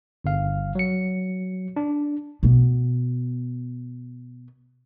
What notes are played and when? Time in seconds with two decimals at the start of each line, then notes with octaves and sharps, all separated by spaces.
0.24 G1 F5
0.75 F#3 C#7
1.76 D4
2.43 B2 B3